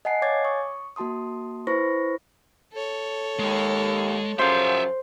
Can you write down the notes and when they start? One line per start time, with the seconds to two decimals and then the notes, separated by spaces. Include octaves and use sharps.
0.05 D#5 F#5 G#5 A5 C7
0.22 C#5 F5 G#5 D6 G#6 A6
0.45 C#6 D#6
0.96 A#3 F#4 A5 C6 D#6
1.67 E4 B4 C5 B5 C#6 A#6
2.72 A4 C#5
3.39 D#2 G#3
4.39 F#2 C#3 F3 C5 E5 F5